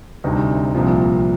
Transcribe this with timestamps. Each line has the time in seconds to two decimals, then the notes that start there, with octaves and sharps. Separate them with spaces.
0.24 D2 C3 G3 C4 D#4
0.75 C2 A#2 F3